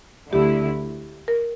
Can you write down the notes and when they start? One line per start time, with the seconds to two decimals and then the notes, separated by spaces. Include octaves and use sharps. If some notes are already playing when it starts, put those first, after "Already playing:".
0.32 D2 D3 A3 E4 G4
1.28 A#4